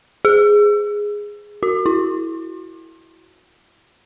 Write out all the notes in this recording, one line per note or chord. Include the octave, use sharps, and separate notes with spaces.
G#4
F#4
E4